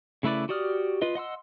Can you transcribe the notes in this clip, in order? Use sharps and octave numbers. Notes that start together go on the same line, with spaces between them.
C#3 A3 E4 B4 D5
F#4 G4 D5 D#6 F6
F4 B4 D#5
D#5 F#5 C6 E6